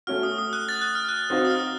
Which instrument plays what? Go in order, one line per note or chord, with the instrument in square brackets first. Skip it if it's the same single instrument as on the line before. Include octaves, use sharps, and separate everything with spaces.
[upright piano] A3 C#4 F#4 [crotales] F6
[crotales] D#6
D#6
F#6
A6
F#6
F6
F#6
[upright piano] C4 D#4 F#4 C5 F5
[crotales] D#6
F6